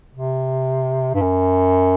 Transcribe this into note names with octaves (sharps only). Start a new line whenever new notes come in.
C3
G2
F#2